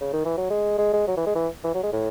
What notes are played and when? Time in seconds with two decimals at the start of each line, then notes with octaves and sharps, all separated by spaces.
0.01 C#3
0.13 D#3
0.25 E3
0.38 F#3
0.50 G#3
0.78 G#3
0.93 G#3
1.08 F#3
1.17 E3
1.26 G#3
1.35 E3
1.64 E3
1.74 F#3
1.83 G#3
1.93 A2